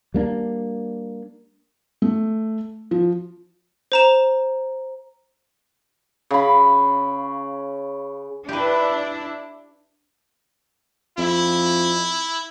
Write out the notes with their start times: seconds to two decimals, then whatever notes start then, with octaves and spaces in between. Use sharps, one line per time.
0.14 G3 A#3 D4
2.02 A3
2.91 F3
3.92 C5 A#5 E7
6.31 C#3 B5
8.49 D4 E4 G4 B4
11.18 F2 E4